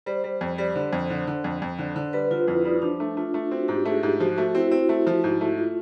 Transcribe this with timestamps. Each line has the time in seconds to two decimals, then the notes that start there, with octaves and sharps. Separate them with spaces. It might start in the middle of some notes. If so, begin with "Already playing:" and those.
0.06 G3 C5
0.24 G3
0.41 F2
0.58 G3
0.75 D3 C5
0.93 F2
1.10 D3
1.27 D3
1.44 F2
1.62 F2
1.79 D3
1.96 D3
2.13 G3 B4
2.31 D3 F4
2.47 F2 E4
2.64 G3 D#4
2.82 F3 D4
3.00 A3
3.17 A3 F4
3.34 A3
3.51 C4 F#4
3.68 G#2 G4
3.85 A3 G#4
4.03 G#2 G4
4.20 F3 F#4
4.37 A3 F#4
4.55 C4 E4
4.71 C4 E4
4.89 A3
5.07 F3
5.24 G#2
5.41 A3
5.58 F4